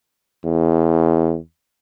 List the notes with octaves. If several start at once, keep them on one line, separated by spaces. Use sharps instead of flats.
E2